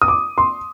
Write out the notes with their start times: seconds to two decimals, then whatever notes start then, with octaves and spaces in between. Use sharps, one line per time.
0.02 D#6
0.08 D6
0.38 C6